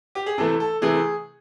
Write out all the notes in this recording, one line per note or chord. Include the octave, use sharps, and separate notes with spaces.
G4
G#4
C3 E3 A3 A4
A4
C3 E3 A3 G#4